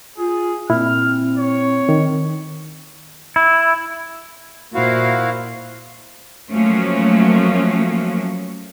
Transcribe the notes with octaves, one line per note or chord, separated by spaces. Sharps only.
F4 G#4
A#2 C4 E4 F6
C#5
D#3
E4
A#2 E4 F#4 C5 F5
F3 F#3 A3 A#3 C#4